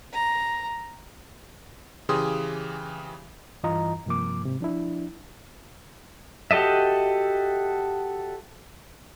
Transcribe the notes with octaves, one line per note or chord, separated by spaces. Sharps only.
A#5
C#3 E3 G4 G#4 C6 D#6
G2 E3 F4 D#5 A#5
G2 C3 F3 A#3 D6
G#2 C3
F3 D4 E4
F#4 G4 A4 D#5 E5